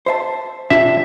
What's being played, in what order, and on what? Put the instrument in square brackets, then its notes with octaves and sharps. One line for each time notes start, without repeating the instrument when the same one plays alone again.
[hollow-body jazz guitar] C5 E5 A5
[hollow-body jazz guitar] D4 F4 G4 [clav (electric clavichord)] E5